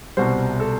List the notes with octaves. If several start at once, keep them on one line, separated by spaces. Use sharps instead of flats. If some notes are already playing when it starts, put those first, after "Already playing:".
C2 B2 G3 C5
A4